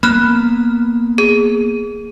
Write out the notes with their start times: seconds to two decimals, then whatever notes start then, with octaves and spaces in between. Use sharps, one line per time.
0.03 A#3 B3 B5 F6 F#6
1.18 G#4